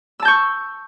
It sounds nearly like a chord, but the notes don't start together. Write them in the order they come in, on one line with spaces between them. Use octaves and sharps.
E6 A5 G6 C#6